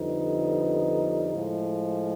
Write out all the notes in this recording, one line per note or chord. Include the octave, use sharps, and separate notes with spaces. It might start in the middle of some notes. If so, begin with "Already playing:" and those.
Already playing: F2 D3 G3 B3 D#4
A2 F3 G#3